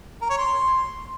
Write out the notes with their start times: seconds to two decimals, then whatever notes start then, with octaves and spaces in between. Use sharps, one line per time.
0.21 A#4
0.30 C#5
0.38 C6